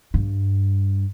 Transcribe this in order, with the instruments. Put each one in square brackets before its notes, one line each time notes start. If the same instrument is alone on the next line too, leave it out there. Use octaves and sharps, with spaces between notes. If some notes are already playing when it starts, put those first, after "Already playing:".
[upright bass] G2